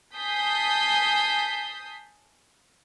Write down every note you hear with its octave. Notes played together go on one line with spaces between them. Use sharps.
G#5 A5 D#6 G6 B6 C7